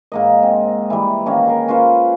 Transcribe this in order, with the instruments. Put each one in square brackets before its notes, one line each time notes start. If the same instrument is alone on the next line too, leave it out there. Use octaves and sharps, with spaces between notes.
[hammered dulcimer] G#2 A#3 D#5
C4
E3 G3
D#3 A#3 C#4
G#4 A#4
C#4 F4 B4 C5